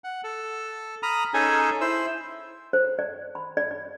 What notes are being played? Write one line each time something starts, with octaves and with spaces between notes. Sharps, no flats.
F#5
A4
A#5 B5 D#6 F6
C#4 D#4 G#4 A4 G#5
E4 C5 E6
C5
D5
B5
D5
D5